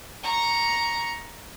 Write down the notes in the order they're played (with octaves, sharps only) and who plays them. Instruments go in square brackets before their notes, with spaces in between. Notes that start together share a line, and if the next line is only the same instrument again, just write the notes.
[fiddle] A#5 C#6